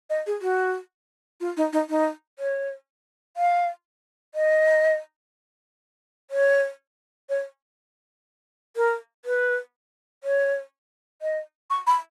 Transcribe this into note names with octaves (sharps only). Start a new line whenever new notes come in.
D#5
G#4
F#4
F4
D#4
D#4
D#4
C#5
F5
D#5
C#5
C#5
A#4
B4
C#5
D#5
C#6
B5